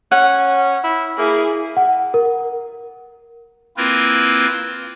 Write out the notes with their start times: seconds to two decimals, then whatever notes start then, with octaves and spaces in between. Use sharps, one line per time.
0.12 C#4 F#5
0.84 E4
1.18 A#3 E4 G#4
1.77 F#5
2.14 A#4
3.77 A#3 C4 E4 F4 A#4 B4